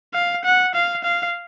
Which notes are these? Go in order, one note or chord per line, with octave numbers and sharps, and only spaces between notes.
F5
F#5
F5
F5